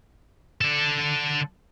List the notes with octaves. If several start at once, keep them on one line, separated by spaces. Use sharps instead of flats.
D3 A4